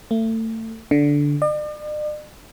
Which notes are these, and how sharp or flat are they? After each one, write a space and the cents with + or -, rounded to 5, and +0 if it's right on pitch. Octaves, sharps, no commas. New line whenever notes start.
A3 +30
D3 -10
D5 +45